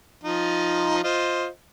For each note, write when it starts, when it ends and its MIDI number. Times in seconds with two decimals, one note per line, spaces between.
0.24 1.03 53
0.24 1.03 63
0.24 1.03 65
1.04 1.47 65
1.04 1.47 72
1.04 1.47 75